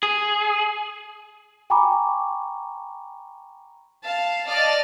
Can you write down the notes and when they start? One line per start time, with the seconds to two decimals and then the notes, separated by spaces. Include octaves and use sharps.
0.03 G#4
1.70 G5 G#5 A#5 B5 C#6 D6
4.04 F5 A5
4.48 D5 D#5 A5 F6 A6